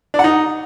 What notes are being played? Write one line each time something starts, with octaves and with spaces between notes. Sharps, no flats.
D4
F#5
D#4